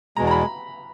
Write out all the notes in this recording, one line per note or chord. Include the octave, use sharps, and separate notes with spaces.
E2 B2 G#3 A#5
A#5
B5